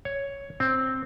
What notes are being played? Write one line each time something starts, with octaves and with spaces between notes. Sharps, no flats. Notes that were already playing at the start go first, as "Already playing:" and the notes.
C#5
C4